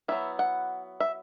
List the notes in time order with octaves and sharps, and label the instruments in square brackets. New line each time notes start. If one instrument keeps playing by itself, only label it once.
[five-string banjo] F#3 B3 E4 E5
F#5
E5